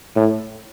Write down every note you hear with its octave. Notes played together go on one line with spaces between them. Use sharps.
A2